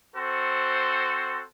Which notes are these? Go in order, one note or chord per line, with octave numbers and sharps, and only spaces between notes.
C4 F#4 A4 C5